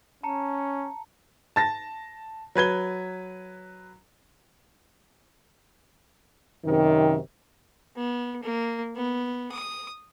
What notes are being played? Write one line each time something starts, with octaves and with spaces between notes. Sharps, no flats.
C#4 A5 A#5 C#7
A5 A6 A#6
F#3 B4 G#6 G7
F#2 C3 D#3
B3
A#3
B3
D#6